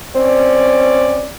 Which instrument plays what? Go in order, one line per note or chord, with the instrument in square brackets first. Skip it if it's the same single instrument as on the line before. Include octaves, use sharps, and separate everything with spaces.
[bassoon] C4 [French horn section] C#4 D5